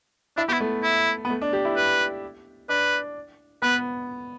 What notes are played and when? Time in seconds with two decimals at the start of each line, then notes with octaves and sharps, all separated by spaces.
0.37 D4 E4
0.49 B3 G4
0.53 E4
0.60 A3
0.83 E4
1.25 B3
1.30 A3
1.42 D4
1.53 G4
1.65 E4
1.77 B4
2.69 D4 B4
3.62 B3 B4